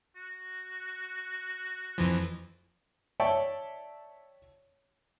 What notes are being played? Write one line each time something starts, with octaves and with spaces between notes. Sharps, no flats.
F#4
F2 E3 F3
C#5 D5 E5 G5 A5 C#6